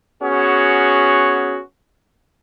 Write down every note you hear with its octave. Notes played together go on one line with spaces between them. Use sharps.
B3 C#4 F#4 G#4